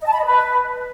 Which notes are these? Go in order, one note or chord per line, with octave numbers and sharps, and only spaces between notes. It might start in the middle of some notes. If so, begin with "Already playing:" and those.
D#5
A5
B5
D#5
B4